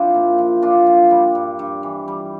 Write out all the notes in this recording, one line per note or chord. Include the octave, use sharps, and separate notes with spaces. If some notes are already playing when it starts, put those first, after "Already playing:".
Already playing: F3 C4 D4 E4
A#2
F3
A#2 D4 F4
F3
G3
G2
G2
E3
G3